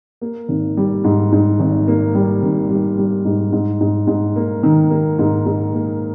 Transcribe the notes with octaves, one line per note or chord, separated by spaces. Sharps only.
A#3
G#1
G3
G#2
G#2
G#1
A#3
G3
G#1
G3
G3
G#2
G#2
G#2
G#2
A#3
D#3
A#3
G#2
G#2
A#3